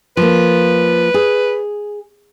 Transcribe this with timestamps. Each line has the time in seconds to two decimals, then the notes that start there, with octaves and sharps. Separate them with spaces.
0.17 F3 A#3 B4
1.14 G#4